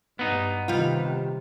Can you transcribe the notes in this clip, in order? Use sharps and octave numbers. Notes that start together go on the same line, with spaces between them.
G2 B3 D#4
C3 D#3 G3 F4